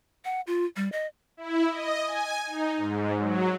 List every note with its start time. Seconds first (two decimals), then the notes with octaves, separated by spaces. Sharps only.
0.25 F#5
0.47 F4
0.76 G3
0.92 D#5
1.37 E4
1.69 D#5
2.04 G#5
2.47 D#4
2.77 G#2
3.17 F#3